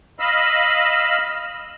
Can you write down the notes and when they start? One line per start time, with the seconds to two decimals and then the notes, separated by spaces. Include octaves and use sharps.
0.19 D#5 F5 B5 E6